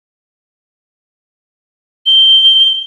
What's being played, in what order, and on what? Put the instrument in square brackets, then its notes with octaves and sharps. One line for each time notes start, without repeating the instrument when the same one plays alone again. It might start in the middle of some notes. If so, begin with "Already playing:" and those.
[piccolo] G7